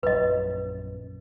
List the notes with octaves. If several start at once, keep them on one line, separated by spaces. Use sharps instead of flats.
A#1 F#2 B4 D#5